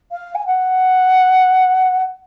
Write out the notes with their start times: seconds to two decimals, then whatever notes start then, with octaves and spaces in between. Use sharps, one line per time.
0.12 F5
0.35 G#5
0.46 F#5